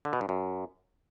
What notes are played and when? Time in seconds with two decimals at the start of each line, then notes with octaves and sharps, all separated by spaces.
0.05 D3
0.13 B2
0.21 G2
0.29 F#2